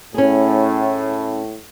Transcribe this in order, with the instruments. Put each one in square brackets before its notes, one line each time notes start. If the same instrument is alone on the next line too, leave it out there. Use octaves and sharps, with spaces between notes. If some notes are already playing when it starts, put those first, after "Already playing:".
[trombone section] A2 [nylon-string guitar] C#4 G#4